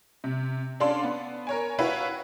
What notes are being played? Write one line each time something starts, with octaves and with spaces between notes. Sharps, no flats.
C3
C#4 D4 A4 D5 F5 C6
B3
A#4 C#5 G#5
E4 F#4 B4 C#5 F5 G5